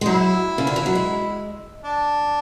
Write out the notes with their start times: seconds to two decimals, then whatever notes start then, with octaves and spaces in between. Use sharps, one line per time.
0.01 G#3
0.06 F#3 E4
0.58 C#3
0.67 D3
0.76 E3
0.86 F#3
0.95 G#3
1.85 D4